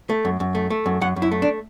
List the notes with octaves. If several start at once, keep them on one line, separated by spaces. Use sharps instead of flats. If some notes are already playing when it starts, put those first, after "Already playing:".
A3
F#2
F#2
A3
A3
F#2
F#2 F#5
F#2
E4
A3
D4